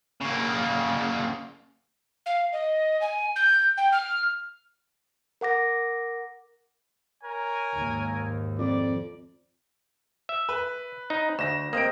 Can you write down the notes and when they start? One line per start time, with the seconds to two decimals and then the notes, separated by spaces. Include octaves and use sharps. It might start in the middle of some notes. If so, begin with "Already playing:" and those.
0.21 C#3 A#3
2.26 F5
2.53 D#5
3.01 G#5
3.36 G6
3.77 G5
3.92 F6
5.41 A#4 F#5 D6 A#6
7.23 A#4 C#5 G#5
7.76 D#2 G#2
8.59 F2 D5
10.29 E5
10.49 B4
11.10 D#4
11.39 D2 A#6 E7
11.73 A#3 C4 D#5 D7